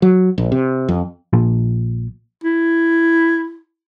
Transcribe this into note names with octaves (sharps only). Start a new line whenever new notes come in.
F#3
A#1
C3
F2
A#1 A#2 F3
E4